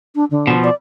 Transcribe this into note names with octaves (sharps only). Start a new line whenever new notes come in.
D4
D3
B2 F3
D5